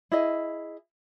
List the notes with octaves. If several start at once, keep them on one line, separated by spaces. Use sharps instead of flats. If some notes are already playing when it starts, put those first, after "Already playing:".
E4 G#4 D#5